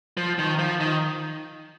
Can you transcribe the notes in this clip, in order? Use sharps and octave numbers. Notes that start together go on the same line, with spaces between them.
F3
D#3
F3
D#3